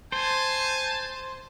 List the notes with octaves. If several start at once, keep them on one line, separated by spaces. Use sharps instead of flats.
C5 G#5 A5